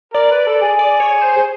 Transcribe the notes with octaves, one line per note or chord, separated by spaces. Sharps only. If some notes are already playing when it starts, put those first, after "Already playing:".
A#4 D5
B4
A4
G#4
D5
C#5
C5
G#4